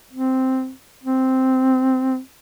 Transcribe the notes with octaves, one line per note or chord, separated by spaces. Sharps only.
C4
C4